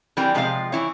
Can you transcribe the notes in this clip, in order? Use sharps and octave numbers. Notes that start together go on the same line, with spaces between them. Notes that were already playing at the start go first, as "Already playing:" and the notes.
E3 G3 C4 A#4 G5
C3 F3 G#3 F4 G4 F5
E3 E4 C#5